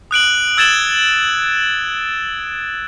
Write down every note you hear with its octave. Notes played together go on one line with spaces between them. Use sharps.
D#6 F#6 D7 F#7
E6 G#6 A6 E7 F#7 G7